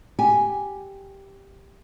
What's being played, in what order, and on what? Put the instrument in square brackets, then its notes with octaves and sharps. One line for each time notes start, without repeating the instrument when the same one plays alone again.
[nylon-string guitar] G4 G#5